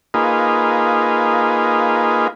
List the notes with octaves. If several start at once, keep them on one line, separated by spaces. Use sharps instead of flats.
A#3 D#4 F4 G#4 B4